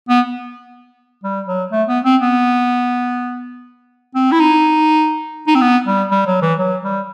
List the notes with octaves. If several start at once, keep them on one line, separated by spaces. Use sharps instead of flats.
B3
G3
F#3
A3
B3
C4
B3
C4
E4
D#4
D#4
C4
B3
G3
G3
F#3
E3
F#3
G3